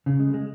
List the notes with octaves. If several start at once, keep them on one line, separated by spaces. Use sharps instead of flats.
C#3
G#3
G#3